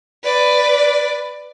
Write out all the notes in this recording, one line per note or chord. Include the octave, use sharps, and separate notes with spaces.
B4 D5